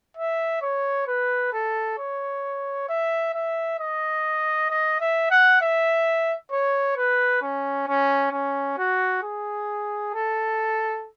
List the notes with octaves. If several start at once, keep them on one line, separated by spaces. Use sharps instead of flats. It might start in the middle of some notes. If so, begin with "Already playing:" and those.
E5
C#5
B4
A4
C#5
E5
E5
D#5
D#5
E5
F#5
E5
C#5
B4
C#4
C#4
C#4
F#4
G#4
A4